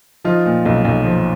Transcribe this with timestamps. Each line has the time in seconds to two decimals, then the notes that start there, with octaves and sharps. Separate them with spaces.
0.25 F3 D#4 F4
0.46 A#2
0.65 B1
0.85 B1
1.04 F3